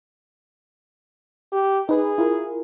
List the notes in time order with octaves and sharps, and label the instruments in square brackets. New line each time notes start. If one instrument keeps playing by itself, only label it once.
[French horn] G4
[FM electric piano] D#4 B4 [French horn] G#4
[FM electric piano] E4 F4 A#4